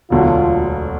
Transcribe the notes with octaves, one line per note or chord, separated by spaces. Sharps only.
E1 D2 D3 F#3 F4